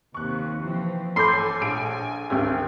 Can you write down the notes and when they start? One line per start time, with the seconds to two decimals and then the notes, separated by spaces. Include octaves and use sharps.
0.14 D#2 C3 C#6 F#6
0.63 E3 F3 C4
1.16 A1 A4 G#5 B5 C6 D6 G6
1.61 A#1 D7
2.30 G#1 D2 G4